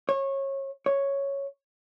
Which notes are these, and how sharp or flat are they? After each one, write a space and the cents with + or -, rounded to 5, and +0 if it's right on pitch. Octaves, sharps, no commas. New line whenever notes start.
C#5 -25
C#5 +0